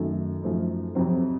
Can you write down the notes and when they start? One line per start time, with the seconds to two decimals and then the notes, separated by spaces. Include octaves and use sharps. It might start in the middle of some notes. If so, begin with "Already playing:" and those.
Already playing: F#2 D#3 A3
0.42 F#2 F3 A3 D#4
0.95 F2 C3 F#3 C4